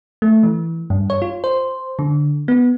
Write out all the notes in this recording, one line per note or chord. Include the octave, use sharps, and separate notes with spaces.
A3
E3
G2
C#5
F4
C5
D3
B3